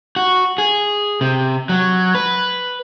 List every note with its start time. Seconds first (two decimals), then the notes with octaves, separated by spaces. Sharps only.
0.16 F#4
0.58 G#4
1.21 C3
1.69 F#3
2.15 B4